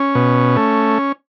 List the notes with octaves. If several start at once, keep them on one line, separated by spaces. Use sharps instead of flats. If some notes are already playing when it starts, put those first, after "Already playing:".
Already playing: C#4
B2
A3